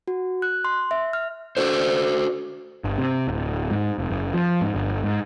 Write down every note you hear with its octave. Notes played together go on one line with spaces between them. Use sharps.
F#4
F#6
C6
E5
F6
F#4 A4 C5
G1
C3
D1
G#2
F1
F#1
F3
G#2
G1
G#2